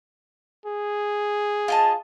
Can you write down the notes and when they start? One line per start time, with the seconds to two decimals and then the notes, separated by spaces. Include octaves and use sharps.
0.66 G#4
1.68 F4 D#5 A5